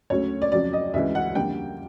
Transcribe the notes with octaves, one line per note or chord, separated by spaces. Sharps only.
D2 C#3 F#3 A3 C#5
D5
F2 C#3 F#3 D5
D#5
D2 C#3 E3 G#3 E5
F#5
F2 D3 G3 A#3 G5